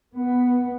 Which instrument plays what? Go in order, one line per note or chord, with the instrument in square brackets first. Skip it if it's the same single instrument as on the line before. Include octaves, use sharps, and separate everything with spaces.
[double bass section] B3